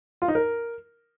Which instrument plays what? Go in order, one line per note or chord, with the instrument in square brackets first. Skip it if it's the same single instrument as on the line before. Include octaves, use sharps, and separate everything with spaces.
[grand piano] F4
D#4
A#4